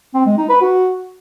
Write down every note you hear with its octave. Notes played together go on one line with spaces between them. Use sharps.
C4
G#3
D#4
B4
F#4